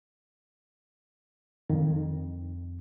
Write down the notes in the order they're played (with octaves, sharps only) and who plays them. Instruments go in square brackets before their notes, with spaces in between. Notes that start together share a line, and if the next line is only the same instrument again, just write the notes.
[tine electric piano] F2 [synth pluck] D#3